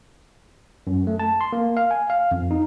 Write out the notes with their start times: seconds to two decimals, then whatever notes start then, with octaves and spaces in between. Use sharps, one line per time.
0.87 F#2
1.07 A3
1.19 A5
1.41 C6
1.53 A#3
1.77 F5
1.91 G#5
2.10 F5
2.31 F2
2.51 D#4